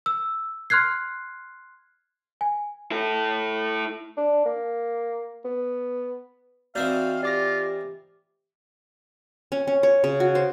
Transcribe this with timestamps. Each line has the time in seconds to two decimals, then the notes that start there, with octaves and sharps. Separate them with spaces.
0.06 E6
0.70 C6 F6 F#6 G#6 C7
2.41 G#5
2.91 E4 A4
4.17 D4
4.45 A#3
5.45 B3
6.75 E3 C4 D#4 F#4 D5 F5 G6
7.23 F4 G4 D5 D6 A#6
9.52 C#4
9.67 C#4
9.83 C#5
10.04 C#3
10.20 F#4
10.35 C5